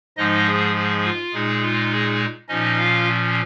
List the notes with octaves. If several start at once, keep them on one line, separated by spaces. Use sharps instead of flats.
G#2 F3 G#3 D#4 D#5
G#4
G#4
F4
A#2 G#3 D#4 G#4
F4
G#4
A#2 F3 C#4 D#4 D#5
F4 F5